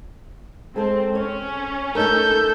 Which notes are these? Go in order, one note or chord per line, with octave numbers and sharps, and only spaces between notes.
G#3 C4 A4
C#4 C#5
A3 D#4 A4 A#4 G6